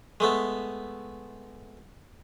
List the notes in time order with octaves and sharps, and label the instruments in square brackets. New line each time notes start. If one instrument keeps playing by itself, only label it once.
[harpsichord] G#3 A3 B3